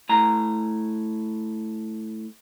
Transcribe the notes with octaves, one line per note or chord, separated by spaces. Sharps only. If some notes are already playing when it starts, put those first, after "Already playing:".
A2 A#5